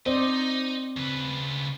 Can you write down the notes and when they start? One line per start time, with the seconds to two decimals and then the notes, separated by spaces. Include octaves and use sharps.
0.06 C4 D#4 C5 D5 D#5
0.97 C#3 B4